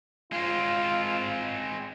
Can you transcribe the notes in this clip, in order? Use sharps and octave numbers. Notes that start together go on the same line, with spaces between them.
G#3 C4 F4